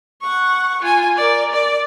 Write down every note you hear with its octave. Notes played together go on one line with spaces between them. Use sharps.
F#5 C#6
F4 G#5
A#4 D5
D5